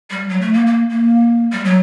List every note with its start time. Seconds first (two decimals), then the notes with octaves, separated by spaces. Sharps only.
0.10 G3
0.29 F#3
0.41 A3
0.54 A#3
0.67 A#3
0.90 A#3
1.52 G3
1.65 F#3